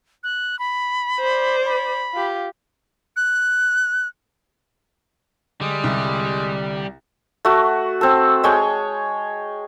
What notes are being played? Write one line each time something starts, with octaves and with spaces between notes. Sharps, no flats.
F#6
B5
C5 D5
B5
F4 G4
F#6
D3 G3 G#3
C2
A3 F#4
C4 A4
G#3 C#5 G5 A5